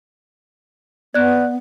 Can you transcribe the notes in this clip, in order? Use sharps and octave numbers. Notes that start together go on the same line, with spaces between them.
B3 D5 F#6